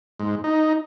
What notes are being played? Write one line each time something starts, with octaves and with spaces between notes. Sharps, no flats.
G#2
D#4